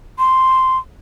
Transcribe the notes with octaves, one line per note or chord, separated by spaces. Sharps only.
C6